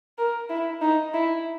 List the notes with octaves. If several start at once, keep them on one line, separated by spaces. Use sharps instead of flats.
A#4
E4
D#4
E4